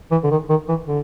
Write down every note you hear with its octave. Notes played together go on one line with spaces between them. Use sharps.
E3
D3
D#3
D#3
E3
D3